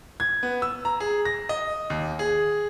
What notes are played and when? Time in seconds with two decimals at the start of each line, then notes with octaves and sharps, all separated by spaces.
0.20 G#6
0.43 B3
0.62 E6
0.85 A#5
1.00 G#4
1.25 A#6
1.49 D#5
1.90 D#2
2.19 G#4